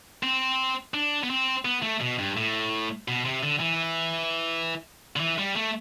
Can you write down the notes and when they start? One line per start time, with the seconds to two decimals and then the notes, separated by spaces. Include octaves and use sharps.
0.23 C4
0.94 D4
1.23 B3
1.30 C4
1.65 B3
1.83 A3
2.01 B2
2.19 G2
2.37 A2
3.08 B2
3.25 C3
3.43 D3
3.60 E3
5.16 D3
5.20 E3
5.38 G3
5.56 A3